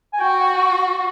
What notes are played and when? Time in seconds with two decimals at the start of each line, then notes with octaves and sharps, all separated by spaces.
0.13 G#5
0.20 F#4 G5
0.40 F#5